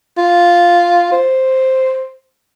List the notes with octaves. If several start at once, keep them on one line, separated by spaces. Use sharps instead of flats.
F4
C5